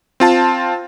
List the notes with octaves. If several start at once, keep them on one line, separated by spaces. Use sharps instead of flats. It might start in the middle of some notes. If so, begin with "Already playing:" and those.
C4 F4 A5